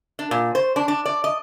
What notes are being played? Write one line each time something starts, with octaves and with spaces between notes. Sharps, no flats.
D4
A#2
C5
D4
D4
D5
D#5